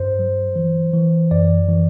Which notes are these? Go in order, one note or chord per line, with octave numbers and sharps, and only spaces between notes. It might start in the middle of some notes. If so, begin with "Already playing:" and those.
Already playing: G2 C5
F#3
E3
E3
F#2 D5
E3